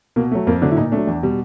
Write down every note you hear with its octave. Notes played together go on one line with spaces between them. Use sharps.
B2 A#3
F#3 A3
F2 A#3
D3 F#3 A3 D4
E4
A#2 D#4
F#3 A3 D4
E2
B2 G3